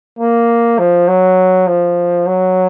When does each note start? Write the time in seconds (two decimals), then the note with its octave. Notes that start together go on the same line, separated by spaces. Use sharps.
0.19 A#3
0.79 F3
1.08 F#3
1.67 F3
2.27 F#3